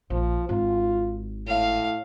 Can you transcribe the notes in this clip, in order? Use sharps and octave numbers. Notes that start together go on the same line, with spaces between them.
A#1 F3
G#1 D#4 F4
A2 F5